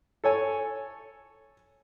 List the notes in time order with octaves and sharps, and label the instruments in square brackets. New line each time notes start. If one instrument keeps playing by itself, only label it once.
[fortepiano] A4 C#5 G#5